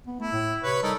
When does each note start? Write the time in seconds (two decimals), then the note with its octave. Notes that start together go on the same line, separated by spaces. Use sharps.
0.07 B3
0.20 A3 E4
0.32 A2
0.63 C3 B4 C#5 B5
0.83 G3 D#4 A4 A#4